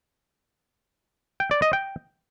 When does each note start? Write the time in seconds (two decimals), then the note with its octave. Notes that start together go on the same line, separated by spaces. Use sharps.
1.40 G5
1.51 D5
1.62 D#5
1.73 G5